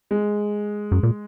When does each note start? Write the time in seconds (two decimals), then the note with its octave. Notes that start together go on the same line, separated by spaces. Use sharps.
0.11 G#3
0.92 F#2
1.03 A#2